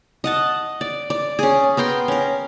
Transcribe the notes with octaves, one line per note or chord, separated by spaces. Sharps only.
D#5 F#5 A5
D5
D5
C#4 G#4
B3 A#4 G5 C6
C#4 A#4